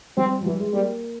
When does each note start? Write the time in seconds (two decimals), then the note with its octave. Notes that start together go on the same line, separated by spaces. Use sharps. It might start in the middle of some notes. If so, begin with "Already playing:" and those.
0.17 G3 C4
0.41 F3
0.46 E3 G3
0.60 G#3
0.73 G3 A#3